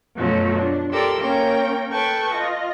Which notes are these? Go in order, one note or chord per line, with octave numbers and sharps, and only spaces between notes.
F#2 B2 F3 F#3 A3
D4
G4 A4 A#4 D5 C6 E6
A#3 C#4 A#4 G5
A4 B4 G5 A5 C#6
F4 D#5